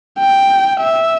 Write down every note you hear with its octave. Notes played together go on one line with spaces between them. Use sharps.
G5
E5